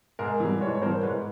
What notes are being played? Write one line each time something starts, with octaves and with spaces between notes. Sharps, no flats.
G#2 G#4 A#4
E3
G3
G#2 B4 C#5
C#5
E3 G3 A#4 C5
G#2 B4 C#5